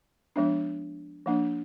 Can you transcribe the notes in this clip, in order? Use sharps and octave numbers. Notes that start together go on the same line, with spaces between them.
F3 G#3 B3 D4
F3 A#3 D4